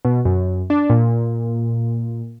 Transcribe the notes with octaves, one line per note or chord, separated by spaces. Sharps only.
B2
F#2
D4
A#2